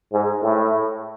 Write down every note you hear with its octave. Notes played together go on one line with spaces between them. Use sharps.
G#2
A2